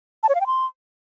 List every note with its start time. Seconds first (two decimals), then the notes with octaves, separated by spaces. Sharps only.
0.23 A5
0.29 C#5
0.35 F5
0.41 G5
0.47 C6